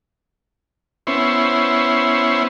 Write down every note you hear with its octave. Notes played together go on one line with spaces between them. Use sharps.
B3 C#4 E4 C5